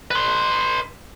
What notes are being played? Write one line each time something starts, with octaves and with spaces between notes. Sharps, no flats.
B4 C6